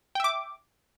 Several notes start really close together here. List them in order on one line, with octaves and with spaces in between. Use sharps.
G5 E5 D6